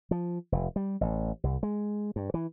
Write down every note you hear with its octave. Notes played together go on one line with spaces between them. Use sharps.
F3
F1
G3
A1
C2
G#3
G2
E3